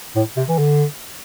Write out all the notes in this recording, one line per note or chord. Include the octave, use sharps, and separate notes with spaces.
A2
C3
E3
D3